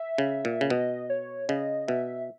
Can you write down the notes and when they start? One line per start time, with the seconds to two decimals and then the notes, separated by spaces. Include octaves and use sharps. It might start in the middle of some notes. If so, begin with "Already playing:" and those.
Already playing: E5
0.18 C#3
0.45 A#2
0.61 C#3
0.70 B2 D#5
1.10 C#5
1.49 C#3 D#5
1.88 B2 E5